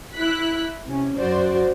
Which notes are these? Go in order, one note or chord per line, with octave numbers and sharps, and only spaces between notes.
E4 F#6 B6
C3 C#4
F#2 F#4 C5 D5